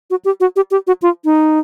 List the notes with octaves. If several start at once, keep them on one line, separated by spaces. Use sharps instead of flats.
F#4
G4
F#4
G4
G4
F#4
F4
D#4